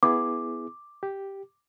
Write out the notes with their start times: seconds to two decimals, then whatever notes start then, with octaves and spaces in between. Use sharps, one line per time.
0.03 B3 E4 G#4 D6
1.03 G4